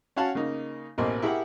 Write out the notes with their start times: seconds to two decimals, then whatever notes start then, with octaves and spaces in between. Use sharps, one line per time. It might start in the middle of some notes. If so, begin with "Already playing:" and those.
0.16 C#4 F#4 C#5 F5 F#5 A5
0.35 C#3 A#3 D#4
0.98 A1 B2 A#3 C5 D#5 G#5
1.22 E4 G4 G#4 A#4 E5 F#5